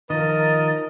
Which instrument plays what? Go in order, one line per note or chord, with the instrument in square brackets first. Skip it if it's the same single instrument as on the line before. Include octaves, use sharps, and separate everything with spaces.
[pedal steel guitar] D#3 F3 [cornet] A#4 [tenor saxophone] D#5 [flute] A6